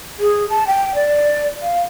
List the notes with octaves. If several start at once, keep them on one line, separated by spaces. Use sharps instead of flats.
G#4
A5
G5
D5
F5